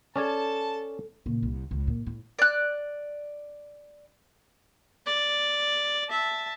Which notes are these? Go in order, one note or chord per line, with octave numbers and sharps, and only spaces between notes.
C#4 A4 D5 G#5 A5
A#2 C#3
C2
C#2
A#2
A2
D5 F#6
D5
E5 A5